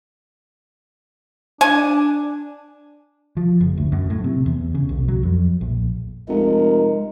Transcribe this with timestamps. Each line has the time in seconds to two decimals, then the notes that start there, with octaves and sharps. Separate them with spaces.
1.61 D4 G#5
3.37 F3
3.60 F#1
3.77 D2
3.92 F#2
4.10 A2
4.24 C3
4.46 E2
4.75 C#3
4.89 B1
5.08 F#3
5.23 F2
5.61 A#1
6.29 F1 G#3 A#4